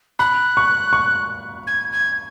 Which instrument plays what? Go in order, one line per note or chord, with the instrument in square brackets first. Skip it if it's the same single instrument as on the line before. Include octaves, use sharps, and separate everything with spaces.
[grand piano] B5 [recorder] F#6
[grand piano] C#6
C#6
[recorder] G#6
G#6